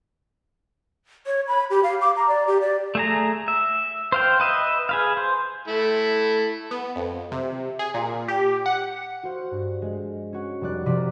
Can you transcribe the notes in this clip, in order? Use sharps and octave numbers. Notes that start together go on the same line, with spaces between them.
C#5
B5
G4
F5
D6
A#5
D5
G4
D5
A3 G#4 A#5
E5
C5 F5 G5
B4 D#5 E5
G#4 B4 F5
C5
A3 E4
B3
F2
C3
G#4
A#2
G4
F#5
F#4 C5 F5
G2
G#3
C#4 F#4
F1 G3 D5 F#6
C3 F3 D5 A#5 B6 D#7